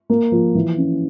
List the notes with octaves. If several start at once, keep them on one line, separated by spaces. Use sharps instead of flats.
A#3
F3
E3
C#4